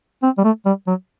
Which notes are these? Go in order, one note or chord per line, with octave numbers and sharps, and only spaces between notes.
C4
G3
A3
G3
F#3